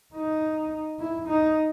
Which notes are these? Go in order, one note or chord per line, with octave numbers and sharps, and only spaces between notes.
D#4
E4
D#4